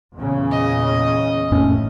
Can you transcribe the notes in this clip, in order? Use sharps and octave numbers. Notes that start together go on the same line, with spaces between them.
E2 A#2 C#3
D#5
F1 A2 C#4